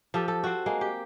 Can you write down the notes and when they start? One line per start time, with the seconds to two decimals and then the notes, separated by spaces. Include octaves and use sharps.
0.14 F3 G4 A4
0.28 A4
0.44 C4 F#4
0.66 G#3 A#3
0.81 G4